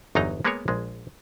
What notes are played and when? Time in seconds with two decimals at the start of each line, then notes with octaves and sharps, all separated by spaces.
0.15 G1 E2 F#3 D#4 D#5 A#5
0.45 G#3 A#3 B3 G#4 A#4 C#5
0.68 A#1 G#3